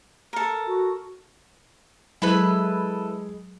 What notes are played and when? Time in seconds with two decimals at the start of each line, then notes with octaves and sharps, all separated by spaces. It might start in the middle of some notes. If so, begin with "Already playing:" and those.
0.33 A4 A#4
0.68 F#4
2.22 F#3 G#3 E4 A4 B4